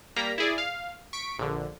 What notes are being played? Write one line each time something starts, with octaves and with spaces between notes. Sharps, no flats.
G3 A#3 A#5 B6
E4 G#4 D5
F5
C#6 B6 D7
A#1 D3